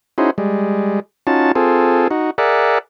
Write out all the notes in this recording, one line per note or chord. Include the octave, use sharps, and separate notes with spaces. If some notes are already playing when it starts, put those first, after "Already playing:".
C#4 D#4 E4 F#4 G#4 C5
G3 G#3
C#4 D#4 F4 F#4 A5
C4 F4 G#4 A4
D#4 F#4
G#4 A#4 D5 E5 F#5